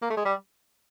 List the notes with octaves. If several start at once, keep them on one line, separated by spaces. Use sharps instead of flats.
A#3
A3
G#3
G3